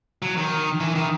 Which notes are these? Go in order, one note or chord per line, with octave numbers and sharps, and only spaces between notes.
F#3
D#3
E3
D#3